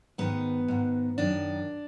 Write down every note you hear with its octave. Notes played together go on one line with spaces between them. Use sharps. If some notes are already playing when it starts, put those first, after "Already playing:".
G#2 D#3 B3
G#2 D#3
F#2 D#3 D4